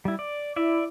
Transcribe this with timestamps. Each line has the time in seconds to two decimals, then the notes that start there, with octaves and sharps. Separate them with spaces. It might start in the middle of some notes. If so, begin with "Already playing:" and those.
0.05 G3 E4
0.19 D5
0.56 E4 D5 E5